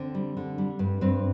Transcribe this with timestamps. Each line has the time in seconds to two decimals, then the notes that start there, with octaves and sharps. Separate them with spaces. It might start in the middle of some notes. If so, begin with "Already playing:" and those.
Already playing: D3 C4
0.14 G3
0.37 D3
0.58 G3
0.79 G2
1.01 G2 C4